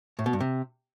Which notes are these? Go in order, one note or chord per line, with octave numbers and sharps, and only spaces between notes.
A2
B2
G2
C3